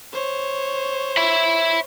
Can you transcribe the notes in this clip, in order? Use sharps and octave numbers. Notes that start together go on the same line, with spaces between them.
C5 C#5
E5 B5